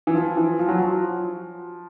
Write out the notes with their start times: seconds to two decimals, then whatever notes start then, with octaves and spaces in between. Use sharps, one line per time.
0.07 E3
0.14 F3
0.37 E3
0.59 F3
0.69 F#3
0.78 F3